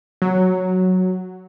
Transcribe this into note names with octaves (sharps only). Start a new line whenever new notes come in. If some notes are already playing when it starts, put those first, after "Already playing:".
F#3